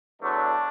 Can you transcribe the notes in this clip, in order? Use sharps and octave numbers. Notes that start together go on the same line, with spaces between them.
E2 D3 F#3 A3 D4